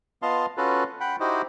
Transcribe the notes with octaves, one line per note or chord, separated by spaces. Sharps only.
B3 F4 D#5 F5 A5 C6
C#4 F4 F#4 A4 B4
F#5 G5 B5
D#4 E4 F#4 G4 C5 D#5